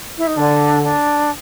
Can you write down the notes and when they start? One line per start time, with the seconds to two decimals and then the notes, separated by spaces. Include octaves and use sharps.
0.17 E4
0.27 D#4
0.37 D3 D4
0.82 D4